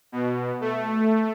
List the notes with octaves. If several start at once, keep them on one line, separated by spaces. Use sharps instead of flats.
B2
A3